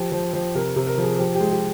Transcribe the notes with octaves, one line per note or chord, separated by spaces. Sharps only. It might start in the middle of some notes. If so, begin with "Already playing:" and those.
Already playing: F3 G4
F3
F3
C3 A#4
C3
A#4
F3
G#4
F3 G4
G4
G#3
G4